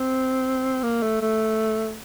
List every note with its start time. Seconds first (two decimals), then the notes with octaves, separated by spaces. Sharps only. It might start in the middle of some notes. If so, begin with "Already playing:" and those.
Already playing: C4
0.83 A#3
1.03 A3
1.21 A3